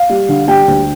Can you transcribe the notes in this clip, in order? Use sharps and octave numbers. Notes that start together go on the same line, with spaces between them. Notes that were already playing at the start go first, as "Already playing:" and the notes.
Already playing: F5
G3
D3
G3 G5
D2